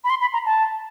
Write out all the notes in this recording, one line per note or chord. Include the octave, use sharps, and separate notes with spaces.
B5
C6
B5
A#5
A5